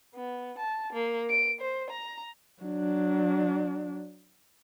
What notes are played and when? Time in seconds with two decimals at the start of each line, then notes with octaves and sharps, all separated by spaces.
0.15 B3
0.58 A5
0.93 A#3
1.30 D7
1.61 C5
1.90 A#5
2.62 F#3 D4